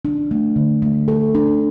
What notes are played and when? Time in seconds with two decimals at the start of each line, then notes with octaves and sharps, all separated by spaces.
0.05 D4
0.31 A3
0.56 D3
0.82 A3
1.08 A4
1.35 D4